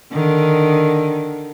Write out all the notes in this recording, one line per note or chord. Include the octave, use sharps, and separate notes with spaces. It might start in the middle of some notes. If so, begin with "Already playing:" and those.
D3 D#3